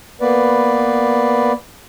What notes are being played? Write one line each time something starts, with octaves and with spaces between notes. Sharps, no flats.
A#3 B3 B4 D5